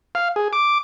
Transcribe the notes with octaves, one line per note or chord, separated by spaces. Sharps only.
F5
G#4
D6